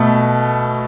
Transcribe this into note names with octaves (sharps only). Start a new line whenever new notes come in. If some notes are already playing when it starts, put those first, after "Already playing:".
Already playing: B2 A3